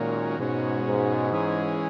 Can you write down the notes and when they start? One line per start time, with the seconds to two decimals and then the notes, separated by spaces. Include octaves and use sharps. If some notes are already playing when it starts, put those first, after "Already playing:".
Already playing: A#2 D#3 G#3 C#4 F#4 A#4
0.39 G#2 B2 G#3 C#4 F#4
0.86 G#2
1.32 E3 G#3 C#4 G#4